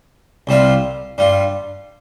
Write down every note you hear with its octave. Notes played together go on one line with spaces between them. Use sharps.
C2 C3 G3 C4 F4
G2 G3 F4